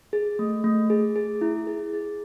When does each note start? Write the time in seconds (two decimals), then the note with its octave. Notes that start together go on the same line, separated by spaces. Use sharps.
0.13 G#4
0.39 A3
0.64 A3
0.90 G#4
1.16 G#4
1.41 E4
1.67 G#4
1.94 G#4